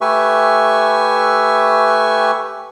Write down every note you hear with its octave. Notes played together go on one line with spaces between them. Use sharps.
A3 G4 B4 E5 G#5 C#6